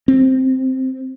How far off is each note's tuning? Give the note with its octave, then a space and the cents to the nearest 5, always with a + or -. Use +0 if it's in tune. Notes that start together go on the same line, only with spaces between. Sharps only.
C4 +0